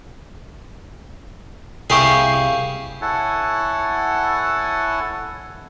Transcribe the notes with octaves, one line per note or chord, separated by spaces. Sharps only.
C2 E4 G4 G#4 F5 C#6 D#6
E4 A4 C#5 F#5 G#5 A5